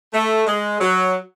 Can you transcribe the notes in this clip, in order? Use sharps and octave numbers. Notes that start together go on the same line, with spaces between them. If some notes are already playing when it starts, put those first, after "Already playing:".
A3
G#3
F#3